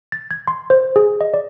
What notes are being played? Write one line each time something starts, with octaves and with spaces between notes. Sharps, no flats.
A6
G#6
C6
C5
G#4
D#5
D5